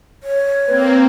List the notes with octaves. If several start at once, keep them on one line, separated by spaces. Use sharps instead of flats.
C#5
A#3 C4 B4